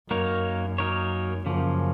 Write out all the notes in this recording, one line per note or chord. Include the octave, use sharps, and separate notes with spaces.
F#2 F#3 A#3 D#4 A#4 C#5
F#3 A#3 D#4 A#4 C#5
F#2 C#3 F3 A#3